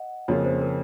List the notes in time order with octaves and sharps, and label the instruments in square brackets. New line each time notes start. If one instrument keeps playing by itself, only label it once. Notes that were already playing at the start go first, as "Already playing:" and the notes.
Already playing: [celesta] D#5 F#5
[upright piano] F2 C#3 F3 A#3 F4 [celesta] C#5
[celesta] C5
A#4